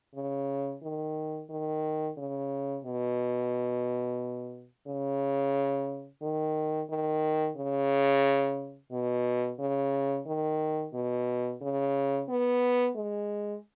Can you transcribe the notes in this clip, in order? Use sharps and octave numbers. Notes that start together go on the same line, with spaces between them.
C#3
D#3
D#3
C#3
B2
C#3
D#3
D#3
C#3
B2
C#3
D#3
B2
C#3
B3
G#3